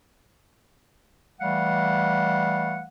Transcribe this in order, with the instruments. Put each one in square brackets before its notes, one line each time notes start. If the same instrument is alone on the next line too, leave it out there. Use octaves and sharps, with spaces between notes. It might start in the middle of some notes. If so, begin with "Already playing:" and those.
[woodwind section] E3 G3 A3 F5 F#5